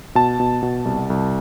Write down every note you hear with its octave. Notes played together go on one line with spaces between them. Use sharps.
B2 A5
B2
B2
C2
C2